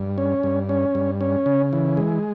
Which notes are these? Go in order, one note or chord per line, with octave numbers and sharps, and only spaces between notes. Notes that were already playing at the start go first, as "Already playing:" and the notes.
Already playing: G2
C#4
G2
C#4
G2
C#4
C#3
E3
G#3